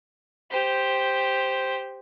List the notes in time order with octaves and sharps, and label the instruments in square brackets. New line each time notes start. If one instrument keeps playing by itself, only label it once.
[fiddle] G4 C5